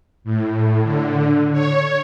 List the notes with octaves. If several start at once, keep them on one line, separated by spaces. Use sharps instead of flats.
A2
D3
C#5